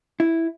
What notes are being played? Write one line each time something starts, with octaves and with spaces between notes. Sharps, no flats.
E4